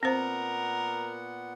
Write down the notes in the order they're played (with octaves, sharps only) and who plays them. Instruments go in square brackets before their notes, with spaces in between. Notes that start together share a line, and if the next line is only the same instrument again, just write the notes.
[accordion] A#2 B3 F#5 [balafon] C4 C5 [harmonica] A#4